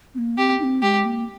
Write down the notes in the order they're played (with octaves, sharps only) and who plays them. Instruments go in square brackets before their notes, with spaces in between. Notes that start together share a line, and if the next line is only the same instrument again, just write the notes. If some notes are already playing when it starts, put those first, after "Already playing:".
[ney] C4
A#3
[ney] C4 [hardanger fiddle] G4
[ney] D#4
C4
[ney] G#3 [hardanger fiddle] G4
[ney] A#3